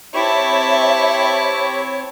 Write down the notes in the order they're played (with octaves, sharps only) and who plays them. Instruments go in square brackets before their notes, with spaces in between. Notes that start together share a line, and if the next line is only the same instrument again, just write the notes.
[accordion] C4 C#5 [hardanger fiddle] E4 A5 [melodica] G4 B5 C#6 [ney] E5